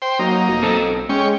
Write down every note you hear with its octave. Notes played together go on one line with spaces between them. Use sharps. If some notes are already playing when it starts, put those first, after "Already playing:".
C5 G5
F#3 A#3 D#4
F1
B1 C4 A4
G#3 C#4 C#5 G5